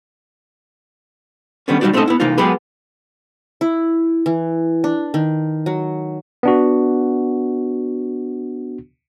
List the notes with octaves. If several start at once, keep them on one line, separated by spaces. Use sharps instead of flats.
D3 D#3 G3 B3 C#4
D2 G3 C#4 D#4 F#4 D5
A3 C4 C#4 D#4 A4 D#5
B3 E4
C3 E3 A#3 D#4 F4
F#3 G#3 B3 G4 G#4 B4
E4
E3
D4
D#3
F#3
B3 D4 F#4